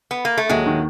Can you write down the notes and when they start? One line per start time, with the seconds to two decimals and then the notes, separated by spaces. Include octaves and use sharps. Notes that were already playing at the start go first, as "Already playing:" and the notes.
0.11 B3
0.25 A#3
0.37 A3
0.49 D#2 F#3 G#3
0.66 D#3